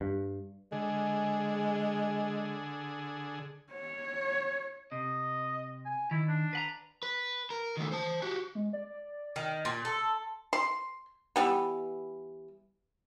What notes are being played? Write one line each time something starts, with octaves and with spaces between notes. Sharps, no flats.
G2
D3 G#3 G#4
C#5
C3 D#5
G#5
D#3 E4
D4
B4 F#5 A#5
B4
A#4
D#3 A3
C5 A5
F#4 G4
G#3
D5
D#3
A#2 C6
A4
C6
E3 G3 B3